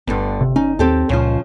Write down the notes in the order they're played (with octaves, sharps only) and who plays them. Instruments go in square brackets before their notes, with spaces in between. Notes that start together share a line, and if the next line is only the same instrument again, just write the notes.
[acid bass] G1 [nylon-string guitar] G2 D3 B3
[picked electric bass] C3
[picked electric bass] C#4 [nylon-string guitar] D#4
[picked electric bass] D#2 [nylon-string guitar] C4 G4 A4
[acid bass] C#2 [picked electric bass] A#2 [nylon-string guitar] C#3 F3 F4